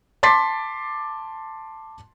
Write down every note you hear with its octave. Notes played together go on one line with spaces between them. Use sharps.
A5 C6 D6 A6 B6 C7